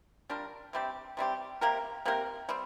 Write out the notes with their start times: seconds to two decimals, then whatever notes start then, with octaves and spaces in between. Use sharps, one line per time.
0.30 G3 D4 F4 A#4
0.73 C3 G3 C4 G4
1.17 C3 G3 C4 G4
1.61 C3 A#3 G4 A#4
2.05 C3 A#3 G4 A#4
2.49 G3 C4